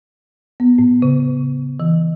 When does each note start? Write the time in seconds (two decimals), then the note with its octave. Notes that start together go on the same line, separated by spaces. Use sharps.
0.60 B3
0.79 A2
1.02 C#3
1.80 E3